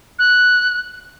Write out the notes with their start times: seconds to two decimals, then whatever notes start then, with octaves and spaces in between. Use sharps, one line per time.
0.19 F#6